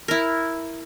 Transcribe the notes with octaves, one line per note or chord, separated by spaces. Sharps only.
E4 A#4